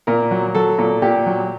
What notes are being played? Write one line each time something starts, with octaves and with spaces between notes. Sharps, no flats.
A#2 A#4
F#3
F#3 A4
A#2
A#2 G4
F#3